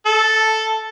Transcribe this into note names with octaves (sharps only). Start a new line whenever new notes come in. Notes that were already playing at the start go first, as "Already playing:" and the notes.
A4